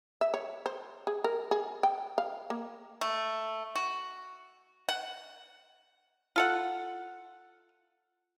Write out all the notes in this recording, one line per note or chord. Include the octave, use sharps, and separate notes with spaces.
E5
C#5
C5
G#4
A#4
G#4
G5
F5
A#3
A3
F#4
F#5
F4 A4 F#5